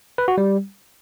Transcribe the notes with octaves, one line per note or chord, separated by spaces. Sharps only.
B4
F#4
G3